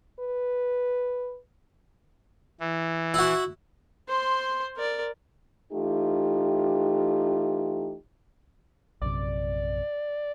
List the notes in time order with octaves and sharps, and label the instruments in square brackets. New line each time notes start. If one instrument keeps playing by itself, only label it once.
[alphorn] B4
[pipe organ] E3
[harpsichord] E4 F#4
[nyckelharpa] C5 C6
A#4 D5
[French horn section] E3 A3 D#4 F4 G4
[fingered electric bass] A#1 F#2 C3 [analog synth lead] D5